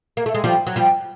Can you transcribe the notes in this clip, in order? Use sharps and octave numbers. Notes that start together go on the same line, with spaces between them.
A#3
A3
G#3
F3 G3
F#3
F3 G3